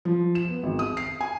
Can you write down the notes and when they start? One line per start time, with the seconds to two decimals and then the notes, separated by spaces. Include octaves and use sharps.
0.05 F3
0.35 E7
0.48 B3
0.63 G#1
0.79 D#6
0.97 C7
1.21 G#5